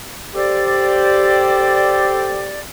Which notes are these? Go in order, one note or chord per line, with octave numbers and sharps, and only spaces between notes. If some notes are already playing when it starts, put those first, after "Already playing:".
G4 A4 C5 D5